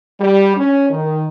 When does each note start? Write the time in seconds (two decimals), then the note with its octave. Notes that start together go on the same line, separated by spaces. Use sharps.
0.20 G3
0.56 C#4
0.90 D#3